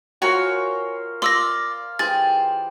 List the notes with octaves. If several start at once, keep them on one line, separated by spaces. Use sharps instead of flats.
F4 F#4 A#4 C5 C#5 G#5
F4 D5 C6 E6 A#6
E3 G4 G#4 C5 A6